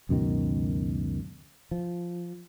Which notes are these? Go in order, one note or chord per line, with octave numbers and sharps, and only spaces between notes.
C#2 F#2 B2 D#3
F3